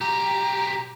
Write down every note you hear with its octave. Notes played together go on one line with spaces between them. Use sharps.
B1 G4 A#5